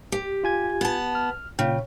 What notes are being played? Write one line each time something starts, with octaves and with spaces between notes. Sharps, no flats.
G4
F4 G#5 G#6
B3 A5
F6
A#2 C#3 G5